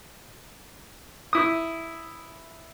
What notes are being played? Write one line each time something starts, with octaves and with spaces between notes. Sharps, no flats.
E4 D#6